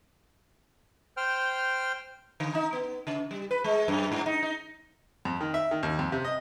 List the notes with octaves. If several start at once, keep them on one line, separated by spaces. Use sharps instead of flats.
C5 G5 F6
D3
D#4
B3
C#3
G3
B4
G#3
F#2
G#2
D#4
D#4
F2
D#3
E5
D#3
D#2
F2
C3
D#5